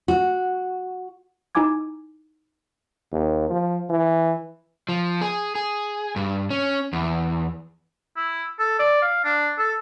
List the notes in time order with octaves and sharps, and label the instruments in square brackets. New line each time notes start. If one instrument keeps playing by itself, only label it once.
[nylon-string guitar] F#4
[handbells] D#4 E4 G#5 D6 G#6
[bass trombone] D#2
F3
E3
[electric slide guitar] F3
G#4
G#4
G2
C#4
E2
[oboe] E4
A4
D5
F5
D4
A4